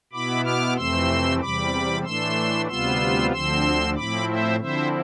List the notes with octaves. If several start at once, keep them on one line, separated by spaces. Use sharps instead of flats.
B2 B3 E4 B5 D6
D6 F6
F2 C3 E3 A3 C4 C6 E6
E2 C3 G3 B5 D6
A2 E3 A3 D4 C6 E6
D2 C3 G3 B3 F4 C6 E6
D2 D3 F3 C4 C6 E6
A2 F3 C4 E4 B5 D6
C5 E5
D3 F3 C4 E4 C5 E5